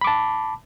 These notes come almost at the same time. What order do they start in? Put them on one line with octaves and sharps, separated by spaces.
B5 D6 A5